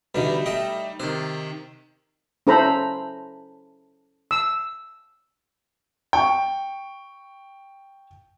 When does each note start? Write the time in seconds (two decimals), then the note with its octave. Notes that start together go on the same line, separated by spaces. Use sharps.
0.15 B2 D3 E3 G3 D#4
0.46 A3 D#5 G5
1.00 C3 D#3 C5
2.47 C#4 E4 A4 C5 A#5 B5
4.31 E6
6.13 G5 C#6